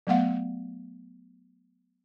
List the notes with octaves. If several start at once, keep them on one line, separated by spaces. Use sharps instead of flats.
F#3 A3 B3 F5 F#5